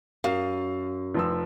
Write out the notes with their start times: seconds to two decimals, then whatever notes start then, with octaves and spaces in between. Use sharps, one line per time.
0.24 F#2 F5
1.14 F1 F3 E6